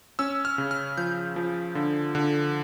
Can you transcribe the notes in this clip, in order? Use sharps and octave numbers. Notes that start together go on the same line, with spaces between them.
C#4 E6
F6
C#3
F6
F3 G6
F3
D3
D3